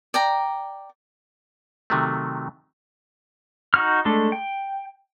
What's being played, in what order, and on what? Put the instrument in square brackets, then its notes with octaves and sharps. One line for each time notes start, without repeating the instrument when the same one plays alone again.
[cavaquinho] D5 G5 A#5
[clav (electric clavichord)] C3 D#3 F#3 A3
[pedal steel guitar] D#4 F#4 F6
G#3 A3 D4 A4
G5